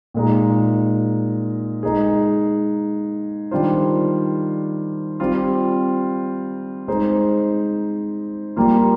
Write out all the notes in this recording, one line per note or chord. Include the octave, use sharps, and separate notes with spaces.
A#2 G#3 D#4
G#3 D#4 G#4
D#3 G3 D4 F4 C5
G3 C4 F4
G#3 D#4 G#4 C5
G3 A#3 F4